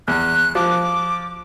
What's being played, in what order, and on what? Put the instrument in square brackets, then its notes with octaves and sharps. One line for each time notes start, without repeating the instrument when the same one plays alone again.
[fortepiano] E2 [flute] F#6
[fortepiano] F3 [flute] D6